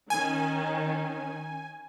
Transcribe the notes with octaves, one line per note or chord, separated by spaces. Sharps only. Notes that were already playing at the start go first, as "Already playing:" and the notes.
D#3 C#4 G#5